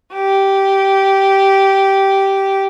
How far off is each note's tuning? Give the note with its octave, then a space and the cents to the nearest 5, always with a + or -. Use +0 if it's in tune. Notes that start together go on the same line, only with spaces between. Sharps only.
G4 -10